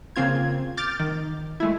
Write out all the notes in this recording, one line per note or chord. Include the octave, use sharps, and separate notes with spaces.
C#3 A#3 C4 F4 G#6
D6 F6 G6 A6
D#3
G#3 A3 E4